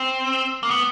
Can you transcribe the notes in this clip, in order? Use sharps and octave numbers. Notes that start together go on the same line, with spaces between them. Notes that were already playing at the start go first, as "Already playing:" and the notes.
Already playing: C4
A#3
B3